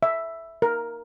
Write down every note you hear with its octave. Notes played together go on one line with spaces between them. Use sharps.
E5
A#4